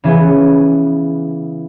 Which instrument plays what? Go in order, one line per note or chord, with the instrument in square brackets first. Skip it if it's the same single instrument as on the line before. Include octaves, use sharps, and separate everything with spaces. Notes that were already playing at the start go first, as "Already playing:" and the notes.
[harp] C#3 E3 B3